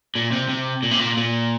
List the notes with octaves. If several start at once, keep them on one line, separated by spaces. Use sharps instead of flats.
A#2
C3
C3
A#2
C3
A#2
A#2